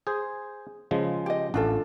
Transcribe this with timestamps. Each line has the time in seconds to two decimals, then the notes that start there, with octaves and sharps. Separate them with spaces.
0.07 G#4 C5
0.91 C#3 F3 G#3
1.26 G4 D#5
1.54 A1 D4 F4 A4